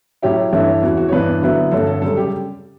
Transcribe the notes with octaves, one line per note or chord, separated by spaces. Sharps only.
A2 F#3 C#4 E4 G4
G2 E3 A3 C#4 E4
E2 C#3 E3 F#4
F#4
C#5
G2 E3 B3 D4 B4
D3 F#3 B3 E4
G2 D3 A3 C#4 A4
A4
F#2 C#3 G3 A4
G4